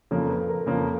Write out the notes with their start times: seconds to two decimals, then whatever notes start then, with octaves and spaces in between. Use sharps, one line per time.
0.11 F2 C#3 F3 A#3 A4
0.29 B4
0.48 A#4
0.67 F2 C#3 F3 A#3 A4